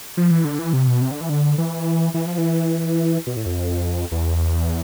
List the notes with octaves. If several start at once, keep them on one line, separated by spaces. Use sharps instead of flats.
F3
E3
D3
E3
C3
B2
C3
D3
E3
D3
E3
E3
F3
E3
B2
A2
F2
E2